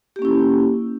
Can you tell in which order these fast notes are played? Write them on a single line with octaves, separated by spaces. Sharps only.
G4 A#3 C#4 E4